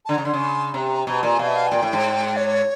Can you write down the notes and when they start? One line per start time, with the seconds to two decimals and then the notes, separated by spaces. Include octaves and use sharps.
0.05 A5
0.09 D3 A#5
0.18 C#3
0.25 D3 C6
0.34 C#3
0.74 C3 A#5
1.07 B2
1.23 A#2
1.39 B2 F5
1.48 E5
1.55 F5
1.67 G#5
1.72 A#2 G5
1.82 A2
1.93 G#2
2.37 C#5